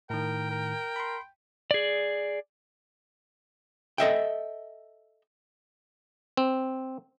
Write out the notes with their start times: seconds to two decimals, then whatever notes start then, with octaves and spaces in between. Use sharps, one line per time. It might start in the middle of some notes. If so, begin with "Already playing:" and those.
0.10 A2 D#3 A#4 G5
0.51 A#4
0.96 B5 C6
1.71 G#4 D5
3.98 A4 D#5 E5 G5
6.37 C4